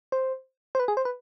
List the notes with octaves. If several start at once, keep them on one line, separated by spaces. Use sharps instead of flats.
C5
C5
B4
G#4
C5
B4